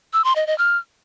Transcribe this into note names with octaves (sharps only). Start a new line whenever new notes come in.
E6
C6
D#5
D#5
F6